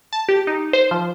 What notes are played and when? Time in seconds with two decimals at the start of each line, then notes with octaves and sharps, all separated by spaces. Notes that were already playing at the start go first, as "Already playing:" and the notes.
0.13 A5
0.29 G4
0.47 D#4
0.73 C5
0.91 F3